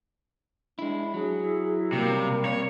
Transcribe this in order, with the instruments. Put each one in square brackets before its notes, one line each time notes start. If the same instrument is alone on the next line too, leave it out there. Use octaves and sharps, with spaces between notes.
[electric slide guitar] G#3 E4 [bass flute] D4
[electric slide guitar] F#3 [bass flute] G#4
[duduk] E4
[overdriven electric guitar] C3 [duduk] G3 [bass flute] A#3
[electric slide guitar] C3 [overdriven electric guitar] C#5